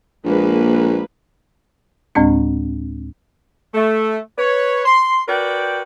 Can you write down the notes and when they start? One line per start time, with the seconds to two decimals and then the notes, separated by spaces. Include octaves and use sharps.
0.24 A#1 G#3 A#3 B4
2.15 D2 A2 G#3 C4 D4
3.75 A3
4.38 B4 C#5
4.85 C6
5.27 F#4 A#4 B4 D5 G5